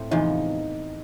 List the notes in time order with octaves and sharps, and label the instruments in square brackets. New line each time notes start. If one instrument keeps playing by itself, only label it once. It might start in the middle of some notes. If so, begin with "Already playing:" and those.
Already playing: [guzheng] A2 A3 C4
[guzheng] E2 C3 F3 [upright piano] D#4